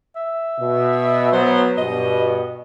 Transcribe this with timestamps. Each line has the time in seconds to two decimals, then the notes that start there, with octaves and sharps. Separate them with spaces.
0.16 E5
0.59 B2
1.33 F#3 B3 C5
1.77 G2 B2 D#5